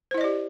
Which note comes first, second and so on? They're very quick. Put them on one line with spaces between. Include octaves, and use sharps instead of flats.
C5 E4 D#5 D5 G4